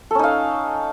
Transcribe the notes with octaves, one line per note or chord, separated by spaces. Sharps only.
C#4 D#4 A4 F5